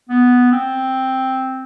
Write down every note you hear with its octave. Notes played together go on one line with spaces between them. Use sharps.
B3
C4